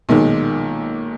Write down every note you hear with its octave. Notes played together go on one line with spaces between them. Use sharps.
B1 A#2 D#3 G#3